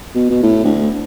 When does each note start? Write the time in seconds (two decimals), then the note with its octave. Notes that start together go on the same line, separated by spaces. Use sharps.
0.15 B2
0.30 B2
0.43 A2
0.64 D2